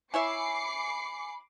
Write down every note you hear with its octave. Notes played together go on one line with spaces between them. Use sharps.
E4 C#5 E5 G#5 B5 D6 C7 C#7